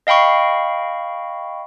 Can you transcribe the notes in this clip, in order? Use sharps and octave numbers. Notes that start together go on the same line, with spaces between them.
D#5 F5 G5 B5 C#6